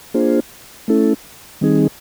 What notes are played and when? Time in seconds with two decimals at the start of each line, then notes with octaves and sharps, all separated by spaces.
0.14 A#3 D4 F4 G#4 C5
0.88 A3 C#4 E4 A4
1.61 D#3 G3 C4 D#4 G#4